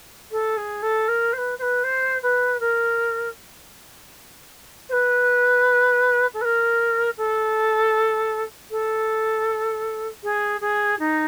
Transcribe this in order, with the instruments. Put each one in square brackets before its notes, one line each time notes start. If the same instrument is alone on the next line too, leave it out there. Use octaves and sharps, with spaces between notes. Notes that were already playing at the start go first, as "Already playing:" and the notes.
[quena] A4
G#4
A4
A#4
C5
B4
C5
B4
C5
B4
A#4
C5
B4
A4
B4
A#4
A4
A4
G#4
G#4
D#4